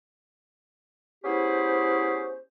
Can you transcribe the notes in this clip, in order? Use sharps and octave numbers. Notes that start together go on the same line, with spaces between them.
B3 C#4 E4 G4 G#4 C5